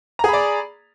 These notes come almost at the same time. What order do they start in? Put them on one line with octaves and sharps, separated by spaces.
A#5 G#4 B5 D5